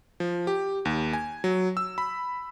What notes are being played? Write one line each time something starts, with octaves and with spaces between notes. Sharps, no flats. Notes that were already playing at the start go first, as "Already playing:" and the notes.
F3
G4
D#2
G#5
F#3
E6
B5